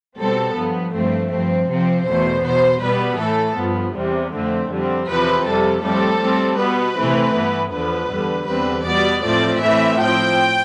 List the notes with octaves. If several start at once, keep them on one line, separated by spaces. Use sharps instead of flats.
B2 G3 C4 A4
G2 F3 B3
G2 F3 A3 C4
G2 F3 C4
C3 F3 C4
E2 B2 A3 C5
B2 B3 C5
B2 G3 B3 B4
A2 E3 A3 A4
G2 F3 B3
E2 C3 G3 C4
F2 D3 A3 C4
F2 D3 G3 C4
E2 C3 F3 C4 B4
F2 C3 G3 A4
A2 G3 C4 A4
A2 G3 C4
B2 B3 B4
C3 E3 A3 C4
G2 E3 B3
E2 D3 F3 B3 B4
E2 D3 G3
E2 D3 G3 C4 B4
B2 G3 B3 D5
A2 F3 A3 C4 D5
A2 E3 A3 C4 E5
A2 F3 C4 G5